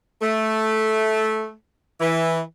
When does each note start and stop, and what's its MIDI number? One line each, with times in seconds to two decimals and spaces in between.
0.22 1.52 57
2.01 2.39 52